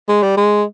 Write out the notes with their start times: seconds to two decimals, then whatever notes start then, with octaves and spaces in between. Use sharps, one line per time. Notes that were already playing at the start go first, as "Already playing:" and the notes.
0.09 G#3
0.23 G3
0.37 G#3